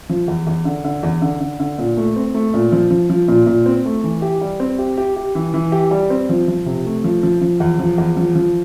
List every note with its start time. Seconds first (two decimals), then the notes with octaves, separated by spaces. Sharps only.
0.09 F3
0.28 E2
0.47 E2
0.65 D3
0.84 D3
1.03 E2
1.22 D3
1.40 D3
1.60 D3
1.78 A#2
1.97 A3
2.16 C4
2.34 A3
2.54 A#2
2.72 F3
2.91 F3
3.10 F3
3.28 A#2
3.47 A#2
3.66 C4
3.85 A3
4.04 E3
4.22 G4
4.41 G3
4.60 C4
4.79 G4
4.98 G4
5.16 G4
5.35 E3
5.54 E3
5.72 G4
5.91 G3
6.10 C4
6.29 F3
6.48 F3
6.66 C3
6.85 A3
7.04 F3
7.23 F3
7.41 F3
7.60 E2
7.79 F3
7.98 E2
8.17 F3
8.35 F3